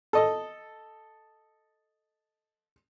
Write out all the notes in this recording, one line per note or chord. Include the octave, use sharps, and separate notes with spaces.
A4 D#5